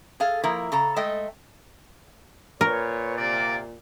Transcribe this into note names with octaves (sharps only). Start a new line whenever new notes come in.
G#4 A4 F5
F3 A#3 E4 A#4
C#3 A4 A#5
G#3 A3 D#5 E5 G5
A#2 A#4 B4 C#5
C3 A#3 D5